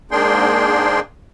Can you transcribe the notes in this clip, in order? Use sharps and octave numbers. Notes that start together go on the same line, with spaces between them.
G#2 A#3 D4 G#4 G5 C6